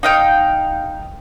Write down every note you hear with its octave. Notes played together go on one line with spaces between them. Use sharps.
D#4 F5 G5